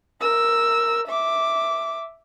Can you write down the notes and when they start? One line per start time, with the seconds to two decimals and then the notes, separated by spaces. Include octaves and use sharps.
0.21 A#4 E6
1.08 E5 D6